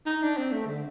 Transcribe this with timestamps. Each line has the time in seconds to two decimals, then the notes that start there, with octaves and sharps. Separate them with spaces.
0.06 D#4
0.22 D4
0.38 C4
0.52 A3
0.67 D3